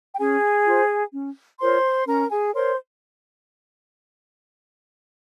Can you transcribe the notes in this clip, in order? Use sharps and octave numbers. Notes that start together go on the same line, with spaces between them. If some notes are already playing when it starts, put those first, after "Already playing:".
G5
C#4 G#4 G#5
F4 C5
C#4
F4 A#4 C5 C#5 C6
C#4 A#4 A#5
G#4 G#5
A#4 C5 C#5 C6